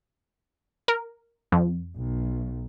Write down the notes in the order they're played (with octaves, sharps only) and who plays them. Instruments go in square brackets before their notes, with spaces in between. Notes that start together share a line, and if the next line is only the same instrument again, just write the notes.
[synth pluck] A#4
F2
[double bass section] B1